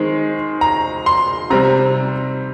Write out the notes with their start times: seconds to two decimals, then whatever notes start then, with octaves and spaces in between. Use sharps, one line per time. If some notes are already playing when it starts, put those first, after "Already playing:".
Already playing: D#3 G#3 C4
0.61 A#5
1.06 C6
1.50 C3 G3 C4 A#5